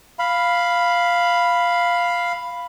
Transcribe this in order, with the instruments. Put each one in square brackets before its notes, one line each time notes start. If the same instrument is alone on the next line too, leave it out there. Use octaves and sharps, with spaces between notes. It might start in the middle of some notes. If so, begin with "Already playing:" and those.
[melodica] F5 B5